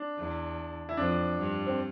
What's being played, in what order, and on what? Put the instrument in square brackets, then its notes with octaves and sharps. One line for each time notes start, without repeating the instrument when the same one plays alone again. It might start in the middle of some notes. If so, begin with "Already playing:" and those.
Already playing: [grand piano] D4
[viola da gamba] E2
[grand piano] E4
[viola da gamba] F2 [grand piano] D4
[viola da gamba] G2
[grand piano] C4